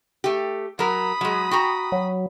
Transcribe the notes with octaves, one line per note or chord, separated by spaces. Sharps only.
A3 G4
F#3 A#4 B5 D#6
F#3 G#3
F#4 G5 A#5
F#3